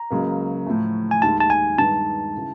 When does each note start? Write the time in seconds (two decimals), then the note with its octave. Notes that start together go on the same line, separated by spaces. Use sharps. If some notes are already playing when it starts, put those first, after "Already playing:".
Already playing: A#5
0.10 C#2 C#3 F#3 A#3
0.67 A2 F3 A3
1.11 G#5
1.22 D#2 D#3 G#3 A5
1.40 A5
1.50 G#5
1.78 G2 D#3 G#3 B3 D#4 A5
2.37 C#3 E3